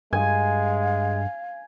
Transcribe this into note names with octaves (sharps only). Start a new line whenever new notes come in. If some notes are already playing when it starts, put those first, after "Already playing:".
G2 G#3 F5 G#5